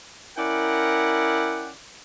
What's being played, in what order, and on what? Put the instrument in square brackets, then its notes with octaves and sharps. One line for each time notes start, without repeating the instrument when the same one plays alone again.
[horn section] C#4 E4 A#4 D5 F#5 G5